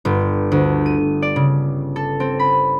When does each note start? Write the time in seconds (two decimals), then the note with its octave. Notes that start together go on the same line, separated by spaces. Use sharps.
0.05 G1
0.52 D2
0.86 D#7
1.22 D5
1.36 C#3
1.96 A4
2.20 C4
2.39 B5